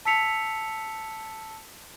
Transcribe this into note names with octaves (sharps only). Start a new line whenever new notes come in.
A5 E6 B6 C#7 F7